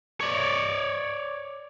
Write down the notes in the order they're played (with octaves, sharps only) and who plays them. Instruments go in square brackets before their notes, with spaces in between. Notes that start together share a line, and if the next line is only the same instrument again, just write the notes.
[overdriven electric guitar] C#5 D5